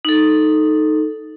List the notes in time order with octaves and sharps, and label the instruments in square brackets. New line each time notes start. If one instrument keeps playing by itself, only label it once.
[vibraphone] D#4 A4